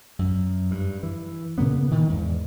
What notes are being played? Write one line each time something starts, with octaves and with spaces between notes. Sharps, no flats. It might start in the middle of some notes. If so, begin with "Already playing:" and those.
F#2
G2
E3
A#2 C#3 A#3 B3
D#3 E3
E2 G#2